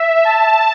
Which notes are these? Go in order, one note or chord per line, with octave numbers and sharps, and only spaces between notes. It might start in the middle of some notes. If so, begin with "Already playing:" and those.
Already playing: E5
A5